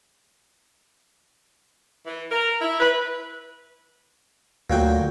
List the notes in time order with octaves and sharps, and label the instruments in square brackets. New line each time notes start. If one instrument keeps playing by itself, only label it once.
[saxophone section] E3
A#4
E4
B4
[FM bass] D2 [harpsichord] A#2 F#3 G5